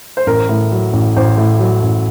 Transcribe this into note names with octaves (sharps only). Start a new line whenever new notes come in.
C5
A1 A#4
A2
F#3
A1
A1 C5
A2
F#3
A1